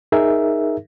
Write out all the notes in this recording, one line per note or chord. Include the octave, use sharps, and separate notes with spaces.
D#4 G#4 A#4 E5